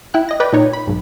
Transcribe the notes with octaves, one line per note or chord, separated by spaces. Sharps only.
E4 G5 F#6
D#5 A#6
B4 D5 G5 B5
A#2 D#4 C#5
B5
B1 G#2